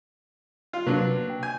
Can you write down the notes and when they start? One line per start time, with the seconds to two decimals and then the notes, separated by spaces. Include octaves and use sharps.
0.73 F4
0.87 C3 F#3 A#3 D4 B4
1.30 G5
1.43 G#5 G6